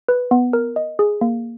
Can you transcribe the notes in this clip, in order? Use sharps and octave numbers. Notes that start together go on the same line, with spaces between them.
B4
B3
A#4
D#5
G#4
A#3